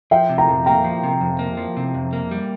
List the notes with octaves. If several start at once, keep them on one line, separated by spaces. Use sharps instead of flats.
F3 E5 G5
C3
G5 A#5
F2
A#3 G5 A#5
F3
C3
F2
A#3
F3
C3
F2
A#3
G3